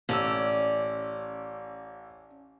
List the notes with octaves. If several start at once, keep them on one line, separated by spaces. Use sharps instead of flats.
A1 C#4 D5 E6